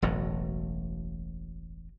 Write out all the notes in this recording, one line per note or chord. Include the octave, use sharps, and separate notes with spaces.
E1 A1 A2 F#3